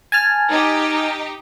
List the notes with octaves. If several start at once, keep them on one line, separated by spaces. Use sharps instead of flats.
G#5 A5 F6
D#4 G4